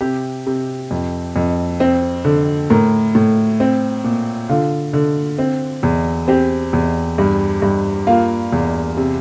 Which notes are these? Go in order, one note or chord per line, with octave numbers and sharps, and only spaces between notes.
C3 G4
C3
F2
F2
C4
D3
A2 A#4
A2
C4
A#2
D3 F4
D3
C4
E2
C4 G4
E2
G2
G2
A#3 F4
E2
C3